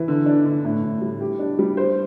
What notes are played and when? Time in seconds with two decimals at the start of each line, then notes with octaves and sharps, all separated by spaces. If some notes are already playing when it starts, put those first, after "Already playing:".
Already playing: E3
0.08 D3
0.26 D4
0.45 D3
0.65 A2
0.83 A2
1.02 G3
1.21 G4
1.39 D4
1.59 G3
1.77 C5